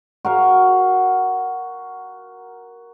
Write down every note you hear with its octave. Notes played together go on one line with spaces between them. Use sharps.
F#4 A#4 F5